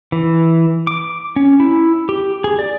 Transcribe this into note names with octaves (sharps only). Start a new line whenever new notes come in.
E3
D6
C#4
E4
G4
G#4
D5